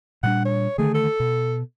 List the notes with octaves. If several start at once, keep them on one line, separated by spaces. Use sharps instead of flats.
A#2 G3 D4 F#5
C#5
D3 D#3 A3 G#4
A4
B2